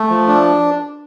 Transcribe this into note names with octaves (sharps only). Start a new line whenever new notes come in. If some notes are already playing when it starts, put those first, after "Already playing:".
Already playing: A3
F3
D4